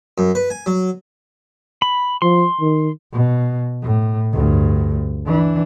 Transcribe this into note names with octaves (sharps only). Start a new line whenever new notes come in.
F#2
B4
G#5
F#3
B5
F3 C6
D#3
B2
A2
D2 G2
E3 D4